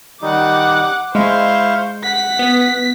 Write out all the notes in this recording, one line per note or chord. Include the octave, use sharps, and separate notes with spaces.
D#3 G3 D#4 F#5 D6
G#3 E4 C5 F5 C#6
F#5 B6
B3